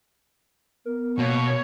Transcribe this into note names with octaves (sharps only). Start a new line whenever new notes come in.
B3 A#4
B2 A#3 C#5